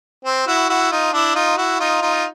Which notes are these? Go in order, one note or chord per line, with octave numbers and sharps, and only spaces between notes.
C4
E4 F#4
E4 F#4
D#4 F4
D4 E4
D#4 F4
E4 F#4
D#4 F4
D#4 F4